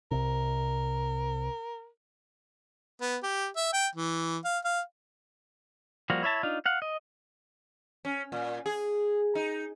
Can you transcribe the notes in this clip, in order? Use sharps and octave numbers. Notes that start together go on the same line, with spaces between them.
C2 C3 A#4
B3
G4
E5
G5
E3
F5
F5
F3 G3 A#3 F#4
E4 C#5 E5 A5
D4 D#4 F4
F5 F#5
D#5
C#4
A#2
G#4
D#4